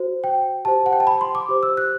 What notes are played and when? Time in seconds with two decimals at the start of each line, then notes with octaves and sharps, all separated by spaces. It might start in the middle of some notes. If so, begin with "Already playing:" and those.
Already playing: F#4 C5
0.24 G5
0.65 G4 C5 A5
0.86 F#5
0.93 G5
1.00 A5
1.07 B5
1.21 C6
1.35 D6
1.49 G4 C5
1.63 E6
1.77 F#6